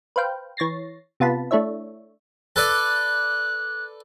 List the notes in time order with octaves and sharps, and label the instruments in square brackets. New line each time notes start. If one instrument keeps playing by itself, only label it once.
[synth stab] B4 C5 F5 G5
E3 C#5 A6 A#6 C7
C3 B3 F4 A5 B5
A3 D4 E4 C#5 E5
[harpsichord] A4 B4 D5 [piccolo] F#6